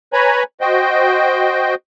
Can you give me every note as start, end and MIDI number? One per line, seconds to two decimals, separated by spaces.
0.13 0.43 71
0.13 0.43 73
0.13 0.43 80
0.13 0.43 82
0.13 0.43 83
0.61 1.75 66
0.61 1.75 72
0.61 1.75 75
0.61 1.75 79